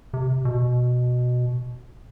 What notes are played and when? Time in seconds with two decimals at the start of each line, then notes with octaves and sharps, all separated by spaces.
0.14 C3
0.45 B2